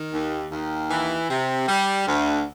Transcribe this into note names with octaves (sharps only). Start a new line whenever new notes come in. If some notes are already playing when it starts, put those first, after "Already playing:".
Already playing: D#3
D#2
D#2
E3
C3
G3
D2